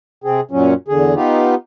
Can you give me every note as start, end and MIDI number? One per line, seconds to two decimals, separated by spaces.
0.24 0.41 48
0.24 0.41 60
0.24 0.41 68
0.51 0.74 42
0.51 0.74 46
0.51 0.74 54
0.51 0.74 61
0.88 1.15 40
0.88 1.15 50
0.88 1.15 68
1.15 1.55 59
1.15 1.55 63
1.15 1.55 65
1.15 1.55 67